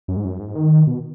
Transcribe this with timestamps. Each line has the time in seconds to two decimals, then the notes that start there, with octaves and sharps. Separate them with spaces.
0.08 F#2
0.17 G#2
0.25 F#2
0.39 G#2
0.55 D#3
0.87 B2